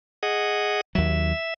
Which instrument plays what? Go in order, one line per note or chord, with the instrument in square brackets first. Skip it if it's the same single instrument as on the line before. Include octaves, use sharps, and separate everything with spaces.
[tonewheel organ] G#4 D#5 F#5
[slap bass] D#2 F#3 [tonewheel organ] E5